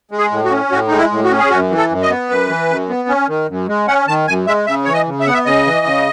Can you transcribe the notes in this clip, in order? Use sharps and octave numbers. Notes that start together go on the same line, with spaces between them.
G#3
G#4
A2
F#4
C#4
A2 F#4
G#3 D#4
E4
A2
F#4
C#4
G#4
F#2 F#4
E3
A4
F#2
D#5
B3
F#2 B4
E3
F#2
B3
C#4
D#3
F#2
G#3
C#4 F#5
D#3 A5
F#2 G#5
G#3 E5
C#3 E5
E3 C#5
D#5
C#3
E5
B3 F#5
E5
C#3 D#5
E3
C#3